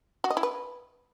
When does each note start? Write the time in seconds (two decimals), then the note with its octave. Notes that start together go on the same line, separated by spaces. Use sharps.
0.24 F#4
0.30 D#5
0.37 E4
0.43 B4